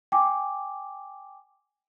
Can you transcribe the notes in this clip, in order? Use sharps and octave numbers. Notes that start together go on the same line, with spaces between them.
G5 G#5 D6